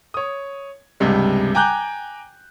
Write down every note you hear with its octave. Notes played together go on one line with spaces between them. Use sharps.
C#5 D#6
C#2 G2 C3 G3
G5 G#5 A#5 D6 F#6 G6